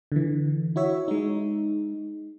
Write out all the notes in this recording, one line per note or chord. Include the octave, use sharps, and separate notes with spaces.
D3 E3
E4 F#4 C#5 E5
G#3 D#4